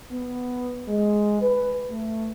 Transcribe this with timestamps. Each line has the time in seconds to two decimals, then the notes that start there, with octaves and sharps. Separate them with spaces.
0.12 B3
0.89 G#3
1.42 B4
1.90 A3